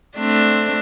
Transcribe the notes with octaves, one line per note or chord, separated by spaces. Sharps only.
A3 C4 D4